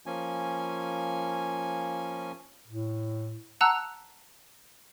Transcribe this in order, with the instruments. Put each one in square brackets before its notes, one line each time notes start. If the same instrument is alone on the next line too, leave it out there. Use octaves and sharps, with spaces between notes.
[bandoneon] F3 A#3 C#4 G#5
[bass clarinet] A2
[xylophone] F#5 A5 A#5 E6 F#6